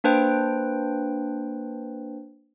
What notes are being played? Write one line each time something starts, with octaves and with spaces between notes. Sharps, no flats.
A#3 D4 B4 C5 G5